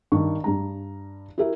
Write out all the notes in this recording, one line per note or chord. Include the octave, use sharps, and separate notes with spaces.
G2 D#3 C#6
G2 G3 A#5
E4 F#4 G4 A#4 E5